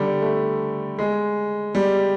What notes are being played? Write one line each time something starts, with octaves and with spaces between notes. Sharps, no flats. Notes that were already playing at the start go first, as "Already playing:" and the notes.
Already playing: D3 G3
A3
G#3
G3